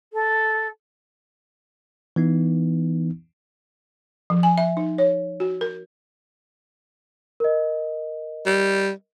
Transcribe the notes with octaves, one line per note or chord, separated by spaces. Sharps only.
A4
E3 B3 D#4
F3
G#5
E5
D#4
C#5
F#4
A#4
A#4 D#5
G3